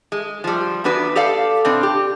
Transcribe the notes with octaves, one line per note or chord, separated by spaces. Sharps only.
G#3
F3 G3
E2 B3 D4 F#4 B4
G4 A4 D5 F5
B2 C4 D4
G4